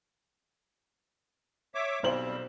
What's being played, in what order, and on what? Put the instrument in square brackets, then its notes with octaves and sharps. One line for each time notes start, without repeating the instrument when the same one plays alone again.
[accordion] C#5 E5 D6
[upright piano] B1 C5 F#7 [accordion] G3 C4